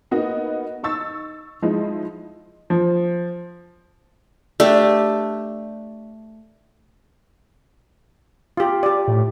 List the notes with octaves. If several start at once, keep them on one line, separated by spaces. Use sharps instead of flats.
A#3 B3 D#4 F#4 D#5
D#4 C#6 E6 A6
F3 G#3 D#4 E4
F3
A3 D4 G4
F4 G4
G4 D5
A2